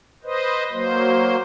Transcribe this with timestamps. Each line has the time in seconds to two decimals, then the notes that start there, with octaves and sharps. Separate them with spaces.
0.24 B4 C5 D#5
0.72 F#3 A#3 C5